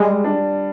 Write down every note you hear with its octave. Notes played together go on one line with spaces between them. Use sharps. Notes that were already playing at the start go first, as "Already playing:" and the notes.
Already playing: G3 G#3
D4